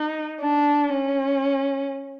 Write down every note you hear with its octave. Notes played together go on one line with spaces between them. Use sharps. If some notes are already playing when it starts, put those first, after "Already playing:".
Already playing: D#4
D4
C#4